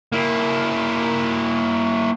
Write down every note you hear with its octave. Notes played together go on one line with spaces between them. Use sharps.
A#3 E4